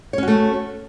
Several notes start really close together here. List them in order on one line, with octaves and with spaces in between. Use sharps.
C#5 C#4 F#4 A3